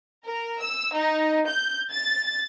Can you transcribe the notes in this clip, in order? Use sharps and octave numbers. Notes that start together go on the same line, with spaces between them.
A#4
E6
D#4
G6
A6